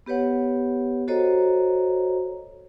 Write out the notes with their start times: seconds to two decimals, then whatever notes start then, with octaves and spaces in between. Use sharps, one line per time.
0.06 B3 G4 B4 C#5 F#5
1.08 F#4 A4 C5 C#5 D#5 A#5